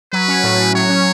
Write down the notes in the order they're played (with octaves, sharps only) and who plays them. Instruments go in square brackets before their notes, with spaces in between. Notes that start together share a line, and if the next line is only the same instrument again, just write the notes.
[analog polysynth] F#3 [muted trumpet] B4
[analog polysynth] C#4
A2
A2
[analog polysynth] F#3 [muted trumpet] C#5
[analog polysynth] C#4